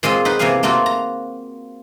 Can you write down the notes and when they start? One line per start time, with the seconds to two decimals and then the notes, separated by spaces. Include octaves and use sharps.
0.03 A#2 G#3 C4 F4 D#5 F5
0.25 D#4 B4 F#5
0.39 C3 E3 A#3 B3 F5 G#5
0.63 A3 A#3 C4 F4 F#4
0.86 A#5